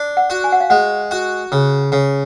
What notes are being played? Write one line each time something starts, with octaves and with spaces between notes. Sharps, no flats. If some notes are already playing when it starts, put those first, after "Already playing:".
Already playing: D4
F#5
F#4
G#5
F#5
F5
G#3 F#5
F#4
C#3 G#4
C#3